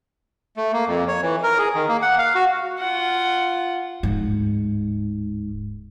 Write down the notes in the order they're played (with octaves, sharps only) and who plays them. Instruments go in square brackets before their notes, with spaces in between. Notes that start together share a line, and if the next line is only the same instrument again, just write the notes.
[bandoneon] A3
A#3
F2
C#5
E3
A#4
G#4
D#3
A#3
F#5
F5
F#4
[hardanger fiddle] F4 F#5
[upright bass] D1 G#2